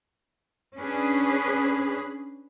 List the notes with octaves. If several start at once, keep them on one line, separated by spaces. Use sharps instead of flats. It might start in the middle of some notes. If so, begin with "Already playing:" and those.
C#4 D4 G#4 B4